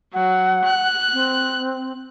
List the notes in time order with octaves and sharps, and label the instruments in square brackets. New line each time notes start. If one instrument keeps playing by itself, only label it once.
[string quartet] F#3 [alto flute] F#5
[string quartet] F#6
[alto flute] C4